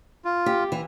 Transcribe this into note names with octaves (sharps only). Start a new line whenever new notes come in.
F4
G4
E3